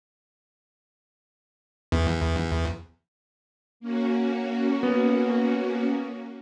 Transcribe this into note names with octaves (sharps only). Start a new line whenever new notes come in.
E2
A#3 C#4 F#4
B3